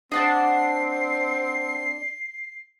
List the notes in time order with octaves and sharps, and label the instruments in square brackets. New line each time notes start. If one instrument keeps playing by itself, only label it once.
[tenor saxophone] C4 [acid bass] D4 [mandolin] D#5 F#5 A5 [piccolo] C7